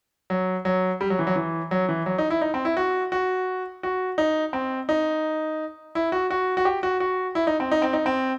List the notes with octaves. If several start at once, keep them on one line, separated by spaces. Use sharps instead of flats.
F#3
F#3
G3
F#3
E3
F#3
E3
F#3
E3
F#3
D#4
E4
D#4
C4
E4
F#4
F#4
F#4
D#4
C4
D#4
E4
F#4
F#4
F#4
G4
F#4
F#4
E4
D#4
C4
D#4
C4
D#4
C4